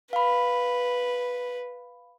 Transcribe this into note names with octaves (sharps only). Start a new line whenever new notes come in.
B4 F5 B5